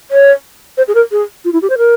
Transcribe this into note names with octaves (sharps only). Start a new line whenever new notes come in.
C#5
C5
G#4
A#4
G#4
F4
E4
G4
C5
A#4